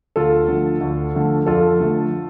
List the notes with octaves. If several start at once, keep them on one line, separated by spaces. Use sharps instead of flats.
D2 F4 A4
D3 F3 A3
D2
D3 F3 A3
F2 F4 A4
D3 F3 A3